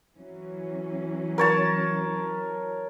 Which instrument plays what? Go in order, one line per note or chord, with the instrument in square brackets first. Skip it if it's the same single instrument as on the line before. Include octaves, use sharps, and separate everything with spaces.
[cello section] E3 F#3 C#4
[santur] A#4 C#5 A5